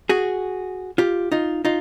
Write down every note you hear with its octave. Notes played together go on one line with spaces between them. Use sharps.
F#4 G#4
F4 G4
D#4 F4
D#4 F4